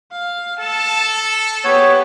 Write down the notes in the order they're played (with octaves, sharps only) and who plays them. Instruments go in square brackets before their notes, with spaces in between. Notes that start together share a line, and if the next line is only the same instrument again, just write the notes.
[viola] F5
[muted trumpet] A4 [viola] A5
[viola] B3 G4 [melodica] C#5